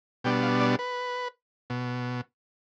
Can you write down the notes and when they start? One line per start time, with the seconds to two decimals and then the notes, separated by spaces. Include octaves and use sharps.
0.24 B2 G3 B3 D4 G5
0.43 F5
0.60 D5
0.79 B4
1.70 B2